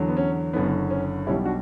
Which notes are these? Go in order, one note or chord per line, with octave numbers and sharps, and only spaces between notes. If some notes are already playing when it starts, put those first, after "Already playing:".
Already playing: E2 D3 F#3
B3
C#4
F#1 F#2 D3 F#3 B3
C#4
B1 B2 G3 C#4 E4
D4 F#4